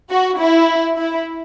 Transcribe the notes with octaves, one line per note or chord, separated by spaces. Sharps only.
F#4
E4
E4